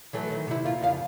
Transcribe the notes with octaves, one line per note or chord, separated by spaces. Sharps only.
E3 F#3 A3
D#3
C3 E4
A#3 F4
F2 C#3 F5